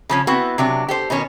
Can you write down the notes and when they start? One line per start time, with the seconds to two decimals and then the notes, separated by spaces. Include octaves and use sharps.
0.09 C#3 F3 C#4
0.27 B3 C4 E4 F#4
0.58 C3 F#3 D4
0.88 G4 A4 C5
1.10 B2 D#3 C#4 C#5